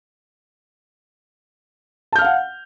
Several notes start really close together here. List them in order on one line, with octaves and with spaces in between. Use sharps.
A5 G6 F6 F5 F#5